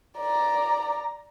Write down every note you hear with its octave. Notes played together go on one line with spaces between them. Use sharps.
D5 A#5